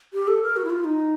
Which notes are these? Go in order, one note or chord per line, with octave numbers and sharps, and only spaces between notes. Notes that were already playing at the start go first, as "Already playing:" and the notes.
G4
A4
A#4
F#4
E4
F4
D#4